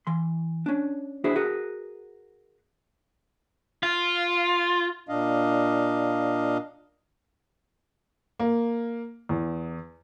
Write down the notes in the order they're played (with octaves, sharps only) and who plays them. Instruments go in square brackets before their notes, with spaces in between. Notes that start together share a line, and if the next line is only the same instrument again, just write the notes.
[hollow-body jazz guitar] E3 C6
C#4 D4
D4 E4 F#4 G#4 C5
F#4 G#4 A#4 B4
[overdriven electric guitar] F4
[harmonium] A#2 D4 D#5 F5
[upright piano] A#3
E2